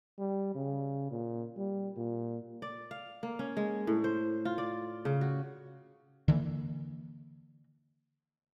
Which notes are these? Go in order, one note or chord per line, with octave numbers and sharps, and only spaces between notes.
G3
C#3
A#2
G3
A#2
D5
F5
A#3
C#4
G#3
A2
C5
F4
D5
C#3
F#4
D3 E3 G#3 A#3